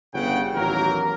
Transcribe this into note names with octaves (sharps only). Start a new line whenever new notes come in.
G1 C#3 F#5 G5
A1 D#2 F#3 A#3 A#4